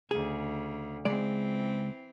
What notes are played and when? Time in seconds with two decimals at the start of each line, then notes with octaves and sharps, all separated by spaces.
0.11 D2 C#3 G#4
1.05 C#2 E3 G#3 C4 D5